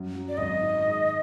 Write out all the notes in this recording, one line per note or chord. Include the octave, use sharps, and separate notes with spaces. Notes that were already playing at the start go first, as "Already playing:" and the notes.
Already playing: F#2 F#3
F#3
D5
G#1 D#5
D#3
G#2